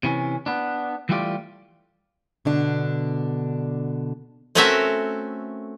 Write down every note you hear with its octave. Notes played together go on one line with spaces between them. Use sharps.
C3 E3 C#4
B3 D4
E3 G3 A3 F4 G4 D5
B2 D3 D4
A3 C4 C#4 F#4 A#4 E5